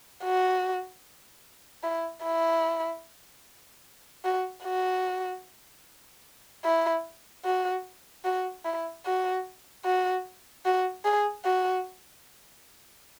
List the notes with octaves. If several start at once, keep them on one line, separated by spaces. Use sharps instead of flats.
F#4
E4
E4
F#4
F#4
E4
F#4
F#4
E4
F#4
F#4
F#4
G#4
F#4